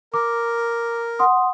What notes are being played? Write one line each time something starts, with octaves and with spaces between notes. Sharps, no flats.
A#4 D6
F#5 C6 D#6